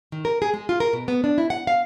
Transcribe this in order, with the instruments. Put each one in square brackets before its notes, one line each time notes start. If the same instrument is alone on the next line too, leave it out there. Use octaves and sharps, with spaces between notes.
[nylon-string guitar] D#3
A#4
G#4
G#3
F4
A#4
B2
B3
D4
E4
F#5
F5